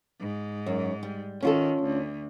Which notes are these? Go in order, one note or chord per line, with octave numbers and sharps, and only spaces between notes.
G#2
F#2
G3
D#3 C#4 F4 A4
D2